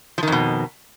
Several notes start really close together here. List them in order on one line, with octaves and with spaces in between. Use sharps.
F3 D#3 F2 B2